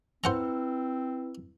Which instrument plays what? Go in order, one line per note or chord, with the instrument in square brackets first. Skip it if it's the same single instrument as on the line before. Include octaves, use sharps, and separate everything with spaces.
[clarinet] C4 [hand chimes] E4 B4 E6 [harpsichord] C5 F#5 A#5